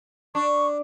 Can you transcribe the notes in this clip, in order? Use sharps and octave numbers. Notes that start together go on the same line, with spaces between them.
D4 C#6